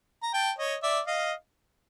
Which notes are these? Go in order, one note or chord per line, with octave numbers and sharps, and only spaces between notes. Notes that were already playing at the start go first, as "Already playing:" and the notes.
A#5
G5 A5
C#5 D#5
D5 E5
D#5 F5